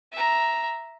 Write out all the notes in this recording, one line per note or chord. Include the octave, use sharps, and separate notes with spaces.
E5 A#5